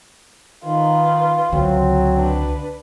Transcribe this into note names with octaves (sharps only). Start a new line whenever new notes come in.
D#3 F4 B4
C#2 D3 F#3 C4
D4 B4